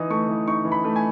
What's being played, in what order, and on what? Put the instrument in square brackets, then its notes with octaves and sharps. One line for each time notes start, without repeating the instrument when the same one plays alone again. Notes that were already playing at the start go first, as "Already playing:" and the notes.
Already playing: [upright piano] E3 D#4 D#6
A3 C#6
E3
D#4 C#6
E3
B5
A3
G#5